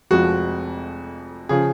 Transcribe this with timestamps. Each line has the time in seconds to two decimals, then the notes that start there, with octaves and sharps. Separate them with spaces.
0.11 F1 F2 F3 G#3 F#4
1.49 C#3 F3 G#4